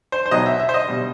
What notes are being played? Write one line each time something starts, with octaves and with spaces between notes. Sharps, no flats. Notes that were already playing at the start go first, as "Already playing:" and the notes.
C5
C5
B1 B2 F#3 D#5
E5
E5
C5
D#5
B2 G3